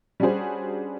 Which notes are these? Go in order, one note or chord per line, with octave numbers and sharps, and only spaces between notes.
G3 C#4 D4 F#4 G#4 C5